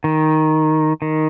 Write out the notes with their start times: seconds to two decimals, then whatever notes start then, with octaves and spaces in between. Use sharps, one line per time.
0.04 D#3
1.02 D#3